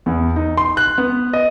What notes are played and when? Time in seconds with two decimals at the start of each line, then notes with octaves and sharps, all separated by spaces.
0.06 E2
0.36 D#4
0.57 C6
0.77 F#6
0.98 B3
1.33 D#5